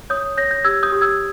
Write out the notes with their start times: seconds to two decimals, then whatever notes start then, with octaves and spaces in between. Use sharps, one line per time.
0.10 C#5 D#6 G6
0.37 C#5 G6 A#6
0.51 G6 A#6
0.64 G4 E6 G#6
0.83 D#6 G6
0.92 G4
1.01 E6 G#6